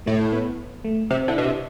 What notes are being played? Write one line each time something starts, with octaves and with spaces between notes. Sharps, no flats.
A2 A3
B3
A3
C3 C4
D3 E4
B2 D4
C3